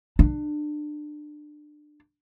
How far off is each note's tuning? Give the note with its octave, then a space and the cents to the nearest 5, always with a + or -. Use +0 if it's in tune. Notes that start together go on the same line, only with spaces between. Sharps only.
D4 +25